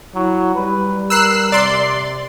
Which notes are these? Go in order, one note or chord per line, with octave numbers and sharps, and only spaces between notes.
F#3 E4
G3 B4
A#4 E6 F#6 C7
C3 D5 C6